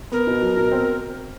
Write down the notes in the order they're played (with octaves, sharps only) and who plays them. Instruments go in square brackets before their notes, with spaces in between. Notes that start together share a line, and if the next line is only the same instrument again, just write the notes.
[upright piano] B3 [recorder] A#4
[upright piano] B2
F#3
B2
C4